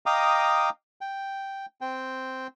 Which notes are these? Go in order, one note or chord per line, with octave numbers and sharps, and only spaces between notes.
D#5 F5 G5 A#5 D6 D#6
G5
C4 G5